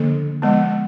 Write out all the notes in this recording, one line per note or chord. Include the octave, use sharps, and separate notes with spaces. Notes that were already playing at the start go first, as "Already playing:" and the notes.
Already playing: D3 F3 A#3 D4 A4
F3 G#3 B3